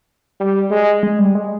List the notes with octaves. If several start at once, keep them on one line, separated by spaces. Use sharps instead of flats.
G3
G#3
G#3
G3
G#3